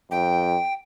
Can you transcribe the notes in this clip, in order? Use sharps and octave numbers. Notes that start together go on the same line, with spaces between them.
F2 G5